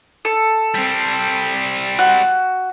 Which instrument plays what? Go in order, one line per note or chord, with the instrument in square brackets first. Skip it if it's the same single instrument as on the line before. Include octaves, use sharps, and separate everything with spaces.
[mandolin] A4
[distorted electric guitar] G3 C4
[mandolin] F#4